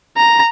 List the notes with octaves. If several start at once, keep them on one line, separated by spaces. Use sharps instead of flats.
A#5